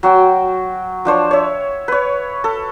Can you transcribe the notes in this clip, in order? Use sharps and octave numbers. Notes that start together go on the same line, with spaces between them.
F#3 F#4 G5
F3 D4 C5 C#5
C#5 E5
B4 C#5
A4